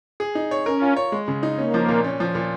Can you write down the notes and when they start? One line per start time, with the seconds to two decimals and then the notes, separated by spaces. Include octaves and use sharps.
0.20 G#4
0.35 D#4
0.51 C#5
0.66 C#4 A#4
0.82 F4
0.97 C#5
1.12 G#3
1.28 C#3
1.43 D#4
1.58 A#3 C#4
1.74 F3
1.89 A#2
2.04 C#4
2.20 F3
2.35 A#2